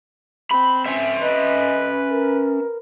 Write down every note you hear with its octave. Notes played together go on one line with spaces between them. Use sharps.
C4 B5
C#4 E5
B4 D#5
A#4